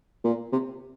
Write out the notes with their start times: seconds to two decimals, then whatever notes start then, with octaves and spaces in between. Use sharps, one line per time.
0.24 A#2
0.52 C3